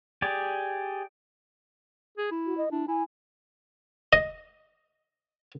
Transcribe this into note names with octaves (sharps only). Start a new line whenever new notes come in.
G4 G#4 D5
G#4
E4
F#4
D#5
D4 E4
E4 G#5
D#5